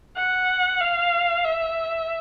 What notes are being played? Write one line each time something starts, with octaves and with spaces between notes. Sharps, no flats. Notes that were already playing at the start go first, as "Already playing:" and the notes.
F#5
F5
E5